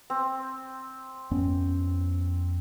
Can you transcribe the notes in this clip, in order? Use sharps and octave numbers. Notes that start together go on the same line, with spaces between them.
C4
F2 B3 C#4